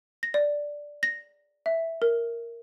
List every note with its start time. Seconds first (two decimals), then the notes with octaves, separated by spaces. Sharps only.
0.23 A#6
0.34 D5
1.03 A#6
1.66 E5
2.02 A#4